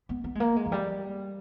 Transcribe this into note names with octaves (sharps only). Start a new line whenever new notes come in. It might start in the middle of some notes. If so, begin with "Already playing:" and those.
B3
B3
G#3
A#3
G#3
E3
G3